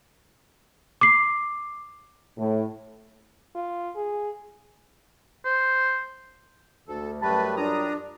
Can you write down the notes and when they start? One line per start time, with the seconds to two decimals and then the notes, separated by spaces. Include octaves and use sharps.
1.01 D6 C7
2.38 A2
3.55 F4
3.96 G#4
5.45 C5
6.88 D2 A4
7.22 F#2 G3 A3 B4 A5
7.57 D4 F4 A#5 D#6